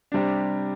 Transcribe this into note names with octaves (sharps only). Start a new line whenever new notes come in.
C3 G3 D4